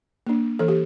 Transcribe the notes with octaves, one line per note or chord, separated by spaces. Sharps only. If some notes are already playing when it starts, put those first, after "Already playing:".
A#3 D4
E3 A4
G4